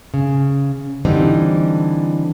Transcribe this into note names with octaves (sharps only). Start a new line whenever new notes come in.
C#3
D3 E3 G3 C4 D#4